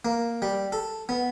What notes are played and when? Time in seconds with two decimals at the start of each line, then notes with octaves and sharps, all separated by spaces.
0.05 A#3
0.42 G3
0.72 A4
1.09 B3